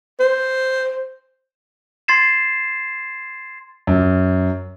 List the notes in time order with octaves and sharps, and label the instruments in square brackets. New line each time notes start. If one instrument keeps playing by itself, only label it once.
[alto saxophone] C5
[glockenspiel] C6 G#6 A6 C7 E7
[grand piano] F#2